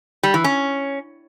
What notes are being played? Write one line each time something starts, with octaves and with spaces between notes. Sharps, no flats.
G3
E3
C#4